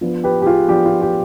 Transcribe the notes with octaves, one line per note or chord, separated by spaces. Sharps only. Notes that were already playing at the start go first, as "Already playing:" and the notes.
F3 B3 D4
G4 B4
G4
F4 G#4
F3 B3 D4 G4
F4
G4